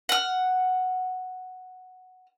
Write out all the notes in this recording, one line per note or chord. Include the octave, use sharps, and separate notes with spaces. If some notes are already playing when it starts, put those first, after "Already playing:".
F#5 F6